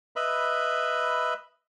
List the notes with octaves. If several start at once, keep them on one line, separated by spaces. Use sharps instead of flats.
B4 D#5 E5 B5